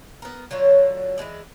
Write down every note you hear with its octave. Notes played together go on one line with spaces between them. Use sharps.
B3 A#4
D3 F#3 F4 C#5
E3 F3 G#3 D5